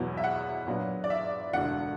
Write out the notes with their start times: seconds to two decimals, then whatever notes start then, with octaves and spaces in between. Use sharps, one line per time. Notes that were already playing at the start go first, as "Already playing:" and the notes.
Already playing: E2 B2 F#3 B3 E4
0.17 E5
0.24 F#5
0.67 A#2 F#3 B3 D4
1.04 D5
1.10 E5
1.53 E1 D2 D3 F#5